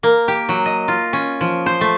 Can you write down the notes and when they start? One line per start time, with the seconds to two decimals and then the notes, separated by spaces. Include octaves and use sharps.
0.03 A#3
0.28 G4
0.49 F#3
0.66 D#5
0.88 F4
1.13 C#4
1.41 F3
1.66 C5
1.81 A3